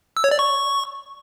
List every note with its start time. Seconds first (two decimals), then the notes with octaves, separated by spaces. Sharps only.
0.17 E6
0.24 C#5
0.31 D5
0.39 C#6